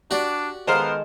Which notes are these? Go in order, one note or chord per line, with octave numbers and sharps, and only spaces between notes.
D4 F#4 G4 D5
D#3 G#3 B3 A4 A#4 C5 F5